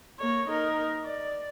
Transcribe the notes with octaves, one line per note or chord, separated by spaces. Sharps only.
A#3 C#5
D#4 A#4
D5